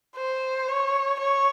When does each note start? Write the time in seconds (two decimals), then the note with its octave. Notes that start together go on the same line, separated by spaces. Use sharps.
0.17 C5
0.68 C#5
1.20 C#5